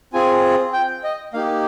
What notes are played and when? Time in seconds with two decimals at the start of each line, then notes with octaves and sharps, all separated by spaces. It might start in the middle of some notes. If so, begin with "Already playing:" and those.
0.13 C4 F4 G#4 G#5
0.73 G5
1.04 D#5
1.33 A#3 D#4 G4 F5